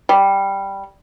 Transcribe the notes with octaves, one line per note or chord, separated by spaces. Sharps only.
G3